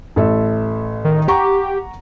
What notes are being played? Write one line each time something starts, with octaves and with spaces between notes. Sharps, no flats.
A1 A4 E5
D#3
G4 F#5 A#5 C#6